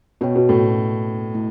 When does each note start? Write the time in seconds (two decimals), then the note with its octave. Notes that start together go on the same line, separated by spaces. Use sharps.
0.21 B2 B3 F#4 C#5 G5
0.35 B2
0.49 A2
1.34 A3 E4